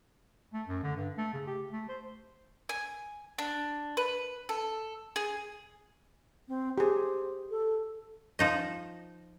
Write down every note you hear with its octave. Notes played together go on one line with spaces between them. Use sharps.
A3
F#2
D3
G2
A3
C#3
G4
A3
C5
G#5
D4
B4
A4
G#4
C4
G4 G#4 C5
A4
F3 D#4 D#5